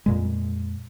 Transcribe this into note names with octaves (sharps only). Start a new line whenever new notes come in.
F2 A#2 G#3